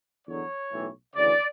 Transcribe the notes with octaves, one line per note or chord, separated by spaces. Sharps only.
E2 D3 F#3 C#5
B1 A2 E3
D2 C#3 E3 D5